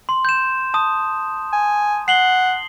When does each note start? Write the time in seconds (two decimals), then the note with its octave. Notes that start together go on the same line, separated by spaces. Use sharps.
0.09 C6
0.25 G6 E7
0.74 A5 D#6
1.52 G#5
2.08 F#5 C7 F#7 G7